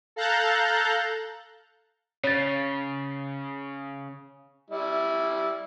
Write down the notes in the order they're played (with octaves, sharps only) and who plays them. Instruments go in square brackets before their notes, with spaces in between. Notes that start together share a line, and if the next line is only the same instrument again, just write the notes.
[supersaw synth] A4 F5 A#5 F#6 G6 A6
[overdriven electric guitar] C#3 [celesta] C#5 A6
[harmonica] G3 E4